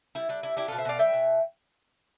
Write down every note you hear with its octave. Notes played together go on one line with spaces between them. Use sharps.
G3 E4
G3 D4
D4 E4
D4 E4 G4
B2 F4 A4
C5 E5
B2 D5 F5
G3 E5 G5
B2